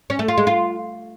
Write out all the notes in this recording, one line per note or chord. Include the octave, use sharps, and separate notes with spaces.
C#4
A3
F4
G#3
F4